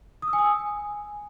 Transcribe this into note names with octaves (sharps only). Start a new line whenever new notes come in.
D#6
E6
G#5
D#6
G#5